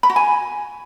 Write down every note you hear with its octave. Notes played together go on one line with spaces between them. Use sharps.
B5
F#4
G#5